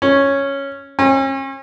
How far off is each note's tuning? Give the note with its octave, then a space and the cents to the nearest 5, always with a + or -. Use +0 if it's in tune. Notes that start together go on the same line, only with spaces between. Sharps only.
C#4 -5
C#4 -40